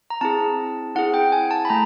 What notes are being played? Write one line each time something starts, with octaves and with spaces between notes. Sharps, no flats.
A#5
C4 E4 G#4 A5
C4 E4 G#4 F#5
G5
G#5
A5
B5
A3 A#5